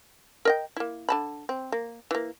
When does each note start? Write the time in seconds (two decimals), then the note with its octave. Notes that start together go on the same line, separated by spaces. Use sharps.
0.45 A#4 D#5 G5
0.76 A#3 E4
1.09 D3 A5 B5
1.49 C4
1.72 A#3
2.11 E3 A#3